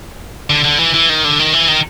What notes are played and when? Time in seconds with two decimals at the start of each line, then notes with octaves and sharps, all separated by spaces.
0.50 D3
0.64 D3
0.79 E3
0.94 E3
1.09 D#3
1.24 D3
1.39 D#3
1.53 E3
1.68 D#3